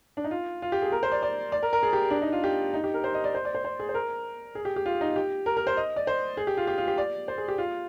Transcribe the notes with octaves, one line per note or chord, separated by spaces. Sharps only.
D4
D#4
F4
F4
G4
G#4
A#4
C5
D5
D5
D5
A#4
A#4
G#4
G4
D4
D#4
F4
G4
D#4
G4
A#4
C5
D#5
D5
C5
D5
C5
C5
G#4
C5
A#4
G#4
G4
G4
F4
D#4
G4
A#4
A#4
C5
D#5
D5
C5
G#4
G4
F4
G4
F4
G4
D5
C5
G#4
G4
F4